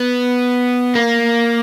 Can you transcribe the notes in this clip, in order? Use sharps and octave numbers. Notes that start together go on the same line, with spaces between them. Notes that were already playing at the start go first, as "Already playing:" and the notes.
Already playing: B3
A#3